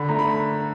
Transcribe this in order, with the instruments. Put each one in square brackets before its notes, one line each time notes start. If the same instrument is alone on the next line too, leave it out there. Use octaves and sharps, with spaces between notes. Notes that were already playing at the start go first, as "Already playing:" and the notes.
Already playing: [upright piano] D3 [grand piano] B5
[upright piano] A3 [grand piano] A#5
[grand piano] B5